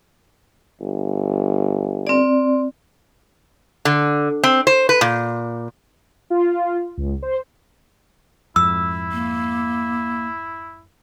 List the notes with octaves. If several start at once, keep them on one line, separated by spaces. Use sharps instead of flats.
G1
C4 D5
D3
C4
C5
B4
A#2
F4
C#2
C5
F2 G#2 E4 E6
A#3